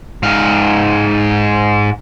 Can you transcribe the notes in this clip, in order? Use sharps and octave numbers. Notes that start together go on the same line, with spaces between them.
G#2 F5